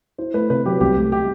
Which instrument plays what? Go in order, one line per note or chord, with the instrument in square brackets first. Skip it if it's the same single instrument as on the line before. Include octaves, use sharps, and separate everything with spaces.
[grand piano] E4 [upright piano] C5
[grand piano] A3 [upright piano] B4
[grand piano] C3 [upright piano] B4
[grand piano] F#3 [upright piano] G4
[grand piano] C2 [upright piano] G4
[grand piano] A3
[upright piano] G4